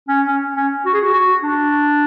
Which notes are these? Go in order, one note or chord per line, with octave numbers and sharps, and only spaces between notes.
C#4
C#4
C#4
F#4
G#4
F#4
F#4
D4